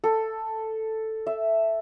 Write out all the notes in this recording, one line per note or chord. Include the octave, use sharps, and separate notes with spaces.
A4
E5